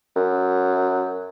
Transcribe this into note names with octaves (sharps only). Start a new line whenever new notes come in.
F#2